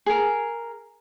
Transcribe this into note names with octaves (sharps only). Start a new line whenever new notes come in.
G#4 A#4